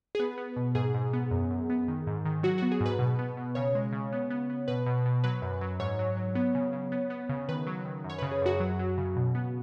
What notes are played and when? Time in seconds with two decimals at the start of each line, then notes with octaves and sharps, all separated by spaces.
0.15 G#4
0.19 B3 B4
0.38 B3
0.56 B2
0.75 G#2 G#4
0.94 G#2
1.13 B3
1.31 F#2
1.50 F#2
1.70 B3
1.88 D#3
2.07 G#2
2.25 D#3
2.43 F#3 F#4
2.58 B3 F#4
2.72 G#4
2.80 G#2
2.86 B4
2.99 B2
3.19 B3
3.37 B2
3.55 C#3 C#5
3.75 G#3
3.92 C#3
4.12 B3
4.30 B3
4.50 B3
4.68 B2 B4
4.86 B2
5.05 B2
5.24 F#3 B4
5.42 F#2
5.61 F#3
5.80 G#2 C#5
5.99 F#3
6.17 F#3
6.35 B3
6.55 C#3
6.73 C#3
6.92 B3
7.10 B3
7.29 C#3
7.49 D#3 B4
7.67 F#3
7.85 D#3
8.04 F#2
8.10 C#5
8.18 C#3 B4
8.31 G#4
8.41 F#2 F#4
8.60 F#3
8.79 F#3
8.98 C#3
9.16 B2
9.35 B3